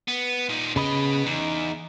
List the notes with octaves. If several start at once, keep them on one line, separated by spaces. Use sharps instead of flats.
B3
A#2 D#4
C#3 B3 D#5 B5 D#6
E2 D#4